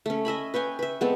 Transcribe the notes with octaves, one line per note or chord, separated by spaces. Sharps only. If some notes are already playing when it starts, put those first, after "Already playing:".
A3 C#4
D#5 E5 G#5 B5
B4 C#5 G5 G#5
B4 E5
G#3 B3 C4 A4